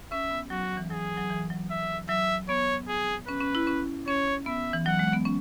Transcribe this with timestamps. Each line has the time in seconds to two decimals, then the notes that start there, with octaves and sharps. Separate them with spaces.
0.12 C#4 E5
0.30 B3
0.50 F#3 F#4
0.63 F#3
0.77 E3
0.90 F#3 G#4
1.17 F#3
1.30 E3
1.50 F#3
1.70 E5
2.09 F#3 E5
2.49 B3 C#5
2.88 G#4
3.27 C#4 B4
3.41 C#4
3.55 E4
3.67 C#4
4.07 C#4 C#5
4.46 B3 E5
4.73 E3
4.86 F#3 F#5
4.99 G#3
5.13 B3
5.25 C#4